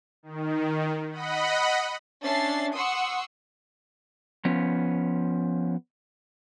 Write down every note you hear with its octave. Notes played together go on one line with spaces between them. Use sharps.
D#3
D#5 F#5 B5
C#4 D4 E5 A6 C7
F#5 C6 C#6 D#6 E6
F3 B3 C#4